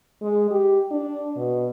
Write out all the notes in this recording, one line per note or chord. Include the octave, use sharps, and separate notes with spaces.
G#3
G4
D4
B2